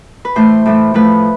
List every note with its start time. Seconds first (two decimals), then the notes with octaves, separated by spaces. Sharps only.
0.25 B4
0.36 A2 E3 A3 C5
0.66 A2 E3 A3
0.94 A2 F3 A3 B4